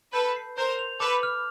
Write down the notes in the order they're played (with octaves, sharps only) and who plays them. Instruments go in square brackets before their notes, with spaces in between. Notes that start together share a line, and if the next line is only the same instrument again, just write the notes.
[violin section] A4 B4 [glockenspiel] G6
[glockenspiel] C7
[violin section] A#4 C5 [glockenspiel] G6
[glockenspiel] F7
[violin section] A4 B4 [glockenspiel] D6
[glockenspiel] F6